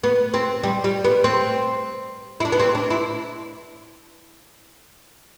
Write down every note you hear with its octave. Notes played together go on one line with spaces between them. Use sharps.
B3
C4
G3
G3
B3
C4
E4
D4
B3
C4
D4
E4